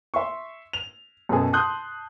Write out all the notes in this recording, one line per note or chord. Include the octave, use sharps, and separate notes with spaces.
E5 C6 C#6
F7
F#2 B2 G#4 A4
A5 C6 D#6 F#6 G6